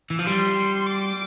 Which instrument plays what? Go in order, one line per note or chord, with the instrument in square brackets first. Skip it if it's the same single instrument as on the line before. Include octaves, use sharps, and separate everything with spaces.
[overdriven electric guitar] E3
F3
[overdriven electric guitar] G3 [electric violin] C6
[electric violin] D6